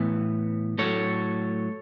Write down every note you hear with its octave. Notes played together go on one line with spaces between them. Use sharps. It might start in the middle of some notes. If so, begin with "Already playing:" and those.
Already playing: A2 E3 B3
A2 F#3 A3 A4 C#5